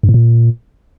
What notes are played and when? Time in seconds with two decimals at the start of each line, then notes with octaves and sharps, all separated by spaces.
0.03 G2
0.09 A2
0.14 A#2